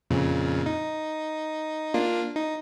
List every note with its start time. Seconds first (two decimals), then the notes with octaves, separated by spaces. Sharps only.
0.10 F2 A#2 C#3
0.66 D#4
1.94 A#3 D4 F4
2.36 D#4